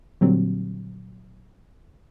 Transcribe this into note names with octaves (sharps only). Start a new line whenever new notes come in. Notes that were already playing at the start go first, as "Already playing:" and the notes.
A#2 D3 F#3 G3 C4